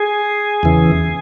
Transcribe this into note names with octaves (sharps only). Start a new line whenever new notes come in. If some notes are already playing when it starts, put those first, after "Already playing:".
Already playing: G#4
E2 C#3 E3